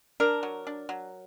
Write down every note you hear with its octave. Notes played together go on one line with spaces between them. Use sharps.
D4 A#4
F#3
D4
F#3